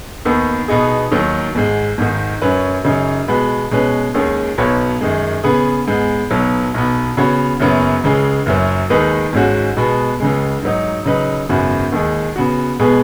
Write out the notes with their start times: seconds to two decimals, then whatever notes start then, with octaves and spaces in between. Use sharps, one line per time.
0.25 D#2 D#3 B3
0.68 B2 B3 D#4 G#4
1.12 D#2 D#3 F#3
1.55 G#1 G#2 G#3
1.98 G#1 G#2 D#3
2.41 F#2 F#3 C#4 B4
2.85 F#2 C#3 F#3 D#4
3.28 B2 G#3 B3 F#4 B4
3.71 B2 G#3 C#4 B4
4.14 D#2 D#3 G#3 C#4 G#4
4.58 B1 B2 B3 F#4 C#5
5.01 F#2 D#3 G#3
5.44 C#3 B3 G#4 B4
5.87 G#2 G#3 B3
6.30 B1 B2 F#3
6.74 B1 B2 B3
7.17 C#3 B3 F#4 C#5
7.60 F#1 F#2 C#3 F#3 B3
8.04 C#2 C#3 G#3
8.46 F#1 F#2 F#3
8.90 D#2 D#3 G#3 D#4 B4
9.33 G#1 G#2 G#3 C#4 F#4
9.77 B2 G#3 B3 F#4
10.20 C#2 C#3 G#3
10.62 G#2 F#3 D#4
11.06 C#3 F#3 D#4 B4
11.49 G#1 F#2 C#3 B3 F#4
11.92 D#2 D#3 G#3
12.36 C#3 B3 F#4
12.79 B2 G#3 B3 G#4 B4